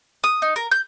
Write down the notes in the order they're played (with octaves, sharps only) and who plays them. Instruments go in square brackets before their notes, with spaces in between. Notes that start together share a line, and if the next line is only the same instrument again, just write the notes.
[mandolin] D#6
D#4
A#4
G6